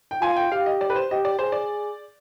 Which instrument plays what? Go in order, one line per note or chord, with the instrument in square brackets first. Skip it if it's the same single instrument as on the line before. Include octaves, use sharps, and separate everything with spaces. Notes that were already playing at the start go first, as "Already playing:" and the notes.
[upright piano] G5
[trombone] F4 [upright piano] G#5
[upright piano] G5
[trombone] G4 [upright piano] F5
[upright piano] D#5
D5
B4
C5
[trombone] G4 [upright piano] D#5
[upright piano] D5
[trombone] G#4 [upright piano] C5
[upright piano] D5